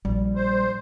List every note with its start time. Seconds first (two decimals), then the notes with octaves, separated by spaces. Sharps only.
0.05 A#1 G3
0.35 C5